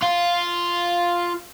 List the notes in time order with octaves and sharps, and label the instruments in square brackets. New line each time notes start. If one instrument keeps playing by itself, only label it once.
[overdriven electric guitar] F4